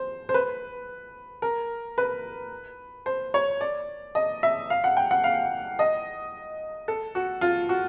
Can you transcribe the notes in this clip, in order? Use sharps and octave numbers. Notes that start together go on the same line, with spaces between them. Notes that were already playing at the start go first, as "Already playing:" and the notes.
Already playing: C5
C5
B4
A#4
B4
C5
C#5
D5
D#5
E5
F5
F#5
G5
F#5
F5
D#5
A4
F#4
F4
F#4